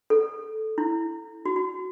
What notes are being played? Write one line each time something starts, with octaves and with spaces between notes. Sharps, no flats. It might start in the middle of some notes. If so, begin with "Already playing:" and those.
A4
E4
F#4
F#4